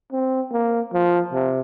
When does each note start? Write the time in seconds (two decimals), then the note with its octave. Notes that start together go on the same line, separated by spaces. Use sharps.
0.12 C4
0.52 A#3
0.93 F3
1.33 C3